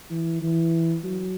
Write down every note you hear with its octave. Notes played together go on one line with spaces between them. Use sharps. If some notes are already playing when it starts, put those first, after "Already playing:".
E3
E3
F#3